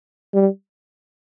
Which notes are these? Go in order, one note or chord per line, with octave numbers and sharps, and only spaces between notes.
G3